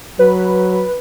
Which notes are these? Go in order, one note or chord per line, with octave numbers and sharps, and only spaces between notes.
F#3 B4